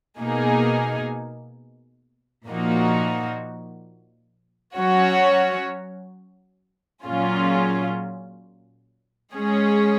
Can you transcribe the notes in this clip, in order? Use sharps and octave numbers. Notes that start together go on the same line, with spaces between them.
B2 A#3 D#4 G#4
A#2 F3 A#3 D#4 F#4
F#3 C#4 F#4 C#5
A#2 F#3 C#4 F4 G#4
G#3 C#4 G#4 C#5